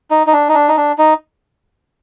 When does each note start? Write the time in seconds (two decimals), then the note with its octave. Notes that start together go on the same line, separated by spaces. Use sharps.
0.11 D#4
0.27 D#4
0.33 D4
0.49 D#4
0.54 D4
0.68 D#4
0.77 D4
0.98 D#4